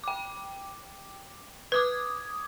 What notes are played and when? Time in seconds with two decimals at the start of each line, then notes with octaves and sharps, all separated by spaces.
0.04 G5 D6
1.72 B4 D6 D#6 G#6